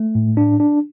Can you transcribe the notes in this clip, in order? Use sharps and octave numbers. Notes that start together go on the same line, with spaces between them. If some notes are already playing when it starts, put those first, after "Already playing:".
Already playing: A3
A2
D4
D4